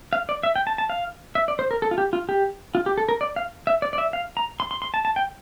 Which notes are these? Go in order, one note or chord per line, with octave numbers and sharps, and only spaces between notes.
F5
D5
E5
G5
A5
A5
F5
E5
D5
C5
A#4
A4
F4
G4
F4
G4
F4
G4
A4
A#4
D5
F5
E5
D5
D5
E5
F5
A#5
C6
C6
C6
A5
A5
G5